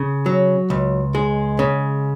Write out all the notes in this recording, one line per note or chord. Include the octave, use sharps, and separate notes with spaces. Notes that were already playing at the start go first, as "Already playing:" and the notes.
Already playing: C#3
F#3
C#2
G#3
C#3